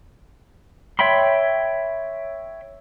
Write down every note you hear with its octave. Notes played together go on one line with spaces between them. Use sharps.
C#5 E5 G5 B5 C6